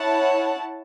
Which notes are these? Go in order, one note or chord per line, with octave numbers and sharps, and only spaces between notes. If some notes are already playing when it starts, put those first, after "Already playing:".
Already playing: E4 C#5 F#5 A5